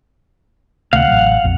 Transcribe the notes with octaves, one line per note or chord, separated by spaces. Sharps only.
D2 C3 A3 F5 F#5
A1 F#3
A#1 F2